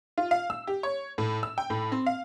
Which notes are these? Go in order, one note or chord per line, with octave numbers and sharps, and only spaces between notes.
F4
F5
E6
G4
C#5
A2
E6
G5
A2
C4
F5